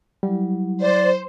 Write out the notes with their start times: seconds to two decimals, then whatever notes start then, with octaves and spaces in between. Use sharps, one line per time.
0.23 F#3 G3 E4
0.81 C5 D5